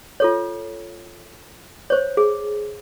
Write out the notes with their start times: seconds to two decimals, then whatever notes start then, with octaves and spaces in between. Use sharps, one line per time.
0.20 F4 A4 C#5
1.90 C5 C#5
2.17 G#4